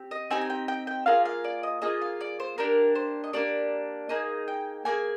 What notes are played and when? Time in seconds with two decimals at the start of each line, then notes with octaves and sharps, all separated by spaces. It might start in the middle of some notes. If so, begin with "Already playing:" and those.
Already playing: C4 G4
0.11 D#5
0.30 C4 D#4 G4 G#5
0.41 G#5
0.50 G5
0.68 G5
0.87 G5
1.06 A#3 F4 G#4 F5
1.25 F5
1.44 D5
1.63 D#5
1.82 A#3 F4 G#4 D#5
2.02 F5
2.21 D5
2.40 C5
2.58 A#3 D4 G4 A#4
2.95 C5
3.24 D#5
3.33 A#3 D4 G4 D5
4.09 A#3 D#4 G#4 D#5
4.48 G5
4.85 A#3 D#4 G#4 G#5